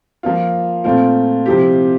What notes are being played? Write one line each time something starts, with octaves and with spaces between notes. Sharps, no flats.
F3 A#3 F4
A#2 A3 C4 F4
C3 F3 C4 E4 G4